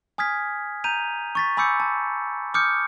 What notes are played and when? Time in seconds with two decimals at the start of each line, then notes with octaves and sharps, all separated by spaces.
0.18 G#5 D#6 F6 G#6 B6
0.84 A#5 G6 D#7 F7
1.35 C#6 A6 B6
1.57 G#5 B5 D6 E6 G6 C#7
1.80 A5
2.54 D6 D#6 F6 G6 C#7